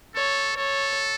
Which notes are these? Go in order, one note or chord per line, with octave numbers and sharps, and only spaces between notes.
A4 C#5
A4 C#5